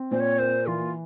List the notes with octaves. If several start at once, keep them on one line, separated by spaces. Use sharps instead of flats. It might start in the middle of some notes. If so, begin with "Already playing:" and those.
Already playing: C4
A#2 C5
C#5
A#3 C5
E3 F4